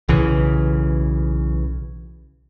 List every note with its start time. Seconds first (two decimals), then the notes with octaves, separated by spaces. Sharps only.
0.09 B1 C#3 E3